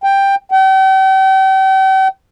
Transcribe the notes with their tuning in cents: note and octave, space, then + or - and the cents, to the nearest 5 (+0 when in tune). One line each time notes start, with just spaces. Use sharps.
G5 +10
G5 -40